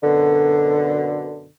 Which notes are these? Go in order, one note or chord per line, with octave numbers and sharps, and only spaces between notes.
F#2 B2 D3